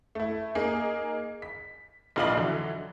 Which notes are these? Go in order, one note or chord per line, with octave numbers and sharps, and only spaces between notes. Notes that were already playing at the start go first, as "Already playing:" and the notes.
A3 E4
A#3 D#4 G#4
B6
A#1 F2 F4 D5 D#5 F#7
D3 E3 F#3